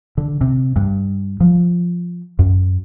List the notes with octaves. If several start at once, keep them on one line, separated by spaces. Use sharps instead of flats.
D3
C3
G2
F3
F#2